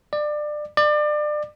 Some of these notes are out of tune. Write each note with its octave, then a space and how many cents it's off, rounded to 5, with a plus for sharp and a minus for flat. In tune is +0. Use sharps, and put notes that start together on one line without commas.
D5 +25
D5 +30